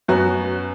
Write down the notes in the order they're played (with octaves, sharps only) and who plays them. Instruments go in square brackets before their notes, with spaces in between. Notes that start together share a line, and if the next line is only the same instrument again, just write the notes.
[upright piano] F#2 F#3 B3 F#4